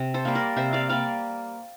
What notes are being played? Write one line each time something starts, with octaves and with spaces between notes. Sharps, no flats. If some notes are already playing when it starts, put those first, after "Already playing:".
Already playing: C3
A4 C5
G3 A#3
A#4 D5
C3 C5 E5
D5 F5
G3 A#3 D5 F5